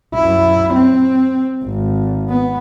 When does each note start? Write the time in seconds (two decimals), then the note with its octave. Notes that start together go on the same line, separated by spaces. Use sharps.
0.14 F#2 E4
0.73 C4
1.64 G#1
2.29 B3